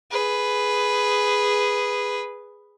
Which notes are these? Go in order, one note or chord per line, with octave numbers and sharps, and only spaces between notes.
G#4 B4